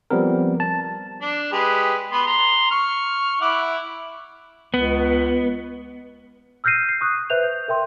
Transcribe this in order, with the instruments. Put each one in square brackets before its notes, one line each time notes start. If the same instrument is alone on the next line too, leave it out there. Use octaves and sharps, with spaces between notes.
[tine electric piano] F3 G3 B3 C4 A#4
A5
[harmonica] D4
G#3 G4 B4
B3 B4 C6
A#5 C6
C#6 F6
E4 F#5 D6
[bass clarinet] C#2 [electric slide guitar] B3
[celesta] E6 F6 G6 A#6 C7 D#7
C7
C#6 D#6 F#6
B4 C5 E5 F#6 G6 F7
G6
A#4 E5 G5 C6